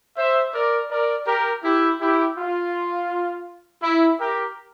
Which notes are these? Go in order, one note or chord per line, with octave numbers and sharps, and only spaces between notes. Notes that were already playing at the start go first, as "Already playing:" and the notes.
C5 E5
A#4 D5
A#4 D5
G4 A#4
E4 G4
E4 G4
F4
E4
G4 A#4